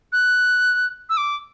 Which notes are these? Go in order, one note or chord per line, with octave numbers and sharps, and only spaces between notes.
F#6
E6
D6